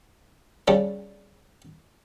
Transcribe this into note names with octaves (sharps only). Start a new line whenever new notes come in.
C#3 G3 C#4 A5